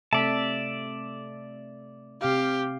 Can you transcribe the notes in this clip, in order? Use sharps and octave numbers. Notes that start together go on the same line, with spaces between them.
C3 A3 D5 E5 A5
C3 G4 F5